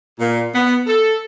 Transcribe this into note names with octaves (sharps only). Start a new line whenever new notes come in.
A#2
B3
A4